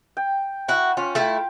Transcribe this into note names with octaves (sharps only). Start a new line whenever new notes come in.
G5
E4 F#4
C#4 F4
A3 E4 F5 G5